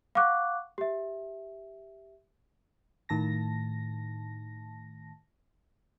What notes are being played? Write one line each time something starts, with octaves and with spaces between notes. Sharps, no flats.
F5 F#5 C#6 D6 F#6
G4 E5
A2 D#3 A5 A#6